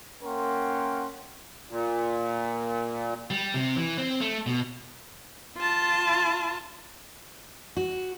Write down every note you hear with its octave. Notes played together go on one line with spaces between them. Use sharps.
A#3 C#4 A#4 F#5 G5 C6
A#2
G3
C3
E3
C4
A3
B2
F4 A5
F#4